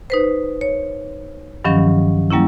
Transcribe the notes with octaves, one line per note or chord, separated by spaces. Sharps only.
D#4 B4 C5
C#5
G2 D#3 F3 F#3 C#4
F#3 G3 A#3 C#4 E4